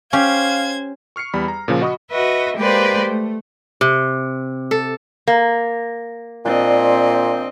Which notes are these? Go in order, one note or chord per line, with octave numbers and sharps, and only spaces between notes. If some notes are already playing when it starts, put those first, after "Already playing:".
C#4 G4 C5 F5 G#6
C#6 F6 C7 C#7
E2 G3 B5
A#5
A#2 C#3 F3 A#3
F#4 D#5 B5 C#6 D#6
F#4 B4 D#5 E5
G#3 A#3 G4 B4 C5 D5
A3
C3
A4
A#3
A#2 C4 D4 D#5